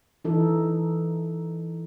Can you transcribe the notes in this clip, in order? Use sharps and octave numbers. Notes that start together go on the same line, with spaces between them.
E3 D#4 A4